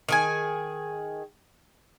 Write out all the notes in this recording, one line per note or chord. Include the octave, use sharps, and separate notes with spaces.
D#3 G#4 G#5